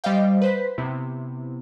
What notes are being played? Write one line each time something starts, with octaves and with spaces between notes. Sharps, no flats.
G3 C5 D#5 F5 G5
B4 C5 B6
C3 B3 E4